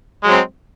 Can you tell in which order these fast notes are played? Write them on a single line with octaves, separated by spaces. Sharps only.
G#3 F#3 C4